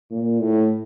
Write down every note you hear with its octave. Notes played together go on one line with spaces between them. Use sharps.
A#2
A2